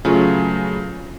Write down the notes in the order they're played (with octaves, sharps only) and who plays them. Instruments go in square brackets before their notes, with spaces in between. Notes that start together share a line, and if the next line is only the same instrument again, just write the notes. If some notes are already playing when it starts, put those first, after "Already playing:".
[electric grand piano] C#3 F#3 A3 [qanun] C#4 F4 B4